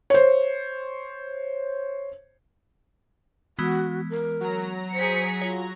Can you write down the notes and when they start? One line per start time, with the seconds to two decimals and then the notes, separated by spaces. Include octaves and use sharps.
0.10 C5 C#5
3.59 E3 G#3 B3 F#4
4.10 A#4
4.41 F#3 A#5
4.93 G#4 C5 B6 C#7
5.42 F4 C#5